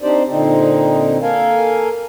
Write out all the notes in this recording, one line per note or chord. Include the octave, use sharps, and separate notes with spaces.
C4 D4 D#4 G4 C5 D5
A#2 D3 C4 D#4
A#3 A4 A#4 F5 G#5